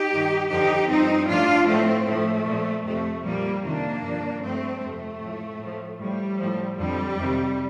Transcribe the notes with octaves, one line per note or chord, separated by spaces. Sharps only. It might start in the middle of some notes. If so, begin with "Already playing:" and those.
Already playing: D#4 G4
G2 D#3
F2 D3 F3 D#4 G4
G2 F3 C4 D#4
A2 F3 D4 F4
A2 F3 A3 C4
A2 F3 A3
A#2 F3
F2 C3 F3 A3
A#2 F3 G3 A#3
F2 C3 D#3 A#3 D4
G2 D3 F3
G2 F3 A3 C4
F2 C3 F3 A3
A2 F3
A2
F3
A2 F3 G3
A2 F3
F2 D3 F3 G3
F2 C3 D#3